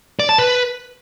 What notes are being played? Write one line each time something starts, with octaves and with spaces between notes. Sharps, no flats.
D5
A5
B4